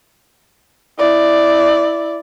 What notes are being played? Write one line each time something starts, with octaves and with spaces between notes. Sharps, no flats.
E4 D5